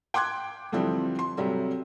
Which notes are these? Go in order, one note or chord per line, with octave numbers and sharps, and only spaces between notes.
G5 C6 D6 F#6 G#6
D3 E3 F3 G3 C4
C6
C3 F#3 G3 A3